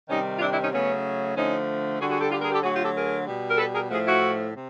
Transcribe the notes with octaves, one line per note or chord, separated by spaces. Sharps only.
C3 D#3 G3 C#4 D#4
F4
D4 E4
D4 E4
C#4 D#4
C#3 F#3 A3 B3 C#4
D3 F3 A3 C#4 D#4
D3 G3 F#4 G#4
F#4 G#4
G4 A4
F4 G4
G#4 A#4
G4 A4
D3 F#3 A3 F#4 G#4
F4 G4
G4 A4
G#4 A#4
B2 G3
A#4
A4 B4
G#4 A#4
A2 F3 A3 F#4 G#4
E4 F#4
C3